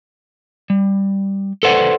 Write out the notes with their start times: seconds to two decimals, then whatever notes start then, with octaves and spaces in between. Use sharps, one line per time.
0.70 G3
1.63 A4 B4 C5 D5 F#5